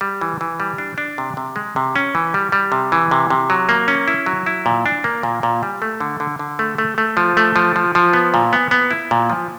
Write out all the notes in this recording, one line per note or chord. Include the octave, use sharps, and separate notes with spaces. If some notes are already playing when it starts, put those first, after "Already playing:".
G3
E3
E3
G3
D4
D4
C3
C3
G#3
C3
C#4
E3
G3
G3
C3
E3
C3
C3
F#3
A#3
C#4
E4
F#3
E4
A#2
D4
A#3
A#2
A#2
G3
A3
D3
D3
D3
A3
A3
A3
F3
A3
F3
F3
F3
B3
A#2
B3
B3
E4
A#2
F3